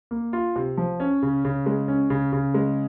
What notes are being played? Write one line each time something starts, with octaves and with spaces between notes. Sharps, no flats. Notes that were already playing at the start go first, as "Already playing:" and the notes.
A#3
F4
C3
F3
C#4
C#3
C#3
G#3
C#4
C#3
C#3
G#3